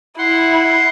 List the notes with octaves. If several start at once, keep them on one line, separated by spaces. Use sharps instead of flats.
E4 F#5 C6